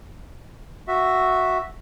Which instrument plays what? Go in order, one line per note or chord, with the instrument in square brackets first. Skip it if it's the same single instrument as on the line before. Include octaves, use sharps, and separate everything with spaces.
[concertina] F#4 E5